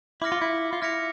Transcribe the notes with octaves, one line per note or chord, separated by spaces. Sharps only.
E4 D6 F6 A#6 C#7
F4
E4
F4
E4 F6 A#6 C#7 F7